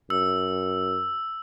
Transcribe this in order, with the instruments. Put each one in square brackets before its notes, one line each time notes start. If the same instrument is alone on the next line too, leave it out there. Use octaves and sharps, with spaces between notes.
[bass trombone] F#2 [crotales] E6